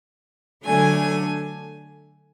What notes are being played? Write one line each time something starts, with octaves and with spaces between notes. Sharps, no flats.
D3 F#3 A3 D4 G#5